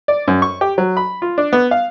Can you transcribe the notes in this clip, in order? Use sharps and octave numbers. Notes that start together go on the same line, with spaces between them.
D5
F#2
C#6
G4
F#3
B5
F4
D4
B3
F5